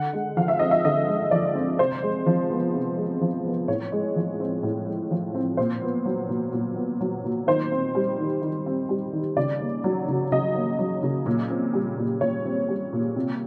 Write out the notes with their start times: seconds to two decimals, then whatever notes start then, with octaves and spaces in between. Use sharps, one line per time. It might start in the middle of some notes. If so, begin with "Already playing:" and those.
Already playing: D3 F#5
0.13 G#3
0.37 F3 F5
0.48 E5
0.59 C4 D#5
0.71 E5
0.84 D3 D#5
1.08 G#3
1.31 F3 D5
1.55 C4
1.79 C3 C5
2.03 G#3
2.26 F3
2.50 B3
2.74 C3
2.97 G#3
3.21 F3
3.45 B3
3.68 A2 C#5
3.92 G#3
4.16 F3
4.40 C4
4.63 A2
4.87 G#3
5.11 F3
5.34 C4
5.57 A#2 C5
5.82 B3
6.05 F#3
6.29 A#2
6.52 A#2
6.76 B3
7.01 F#3
7.24 A#2
7.47 D#3 C5
7.72 C4
7.95 G3
8.19 D#3
8.42 D#3
8.66 C4
8.89 G3
9.13 D#3
9.37 C#3 D5
9.61 A#3
9.84 F#3
10.08 C#3
10.32 C#3 D#5
10.55 A#3
10.79 F#3
11.03 C#3
11.26 A#2
11.50 C4
11.74 G3
11.98 A#2
12.21 A#2 C#5
12.45 C4
12.69 G3
12.93 A#2
13.16 C3